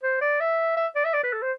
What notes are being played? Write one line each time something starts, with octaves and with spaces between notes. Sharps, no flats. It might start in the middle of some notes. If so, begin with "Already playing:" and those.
C5
D5
E5
E5
D5
E5
D5
B4
A4
C5